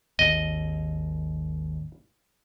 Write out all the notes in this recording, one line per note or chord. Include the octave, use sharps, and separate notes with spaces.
G#1 D#2 D#5